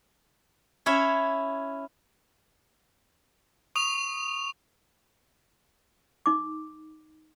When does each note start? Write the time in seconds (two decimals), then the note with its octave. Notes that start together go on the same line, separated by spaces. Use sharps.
0.86 C#4 E4 C#5 E5
3.75 C#6 D#6 F7
6.26 D#4 D6